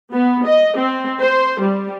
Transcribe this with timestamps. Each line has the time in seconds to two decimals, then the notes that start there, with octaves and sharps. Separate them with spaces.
0.13 B3
0.45 D#5
0.77 C4
1.20 C5
1.61 G3